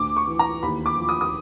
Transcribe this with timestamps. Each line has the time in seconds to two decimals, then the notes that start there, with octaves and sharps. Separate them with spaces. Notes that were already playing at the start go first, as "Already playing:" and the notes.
Already playing: D2 D6
0.17 C#6
0.27 E3
0.39 A#5
0.63 D#2 B5
0.86 D6
0.97 F3
1.09 D#6
1.21 D#6